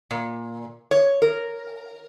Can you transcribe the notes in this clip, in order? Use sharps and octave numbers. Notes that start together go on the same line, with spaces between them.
A#2
C#5
A#4